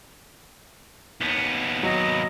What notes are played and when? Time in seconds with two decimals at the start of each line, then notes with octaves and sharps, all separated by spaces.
1.21 D#2 B3 B6
1.83 F#3 D#5